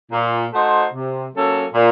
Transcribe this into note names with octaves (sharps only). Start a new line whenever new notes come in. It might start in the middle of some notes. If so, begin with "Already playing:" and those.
A#2
A3 D#4 F#4 C5
C3
F#3 A#3 C#4 A4
A#2